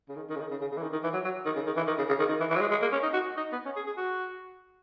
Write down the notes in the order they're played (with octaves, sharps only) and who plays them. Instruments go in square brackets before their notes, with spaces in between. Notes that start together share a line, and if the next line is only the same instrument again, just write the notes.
[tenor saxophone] C#3
D#3
D#3
C#3
D#3
C#3
C#3
C#3
E3
D#3
D#3
E3
F#3
F#3
D#3
C#3
D#3
E3
D#3
C#3
C#3
D#3
D#3
E3
E3
F#3
G#3
G#3
A#3
C#4
D#4
F#4
D#4
B3
C#4
G#4
G#4
F#4